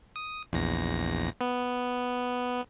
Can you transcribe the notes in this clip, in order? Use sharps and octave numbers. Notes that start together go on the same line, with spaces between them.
D#6
A#1 E2 A#6
B3